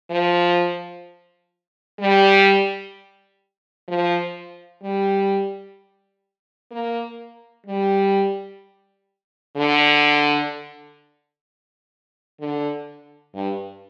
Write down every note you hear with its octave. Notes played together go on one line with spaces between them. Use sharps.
F3
G3
F3
G3
A#3
G3
D3
D3
G2